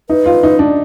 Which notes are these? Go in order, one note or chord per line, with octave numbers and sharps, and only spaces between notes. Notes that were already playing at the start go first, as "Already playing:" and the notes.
D#4 B4
F4
D#4
D4